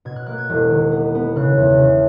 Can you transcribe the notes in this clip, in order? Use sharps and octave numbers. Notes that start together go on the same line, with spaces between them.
B2 G#6
F#6
A#3 F#6
G#6
E1
D#3
B3
B3
C#3 F#6
E2
C#3